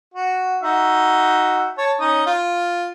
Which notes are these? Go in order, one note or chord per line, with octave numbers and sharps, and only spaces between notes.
F#4
D#4 F#4 E5
C#5 A5
C#4 D#4 D#6
F4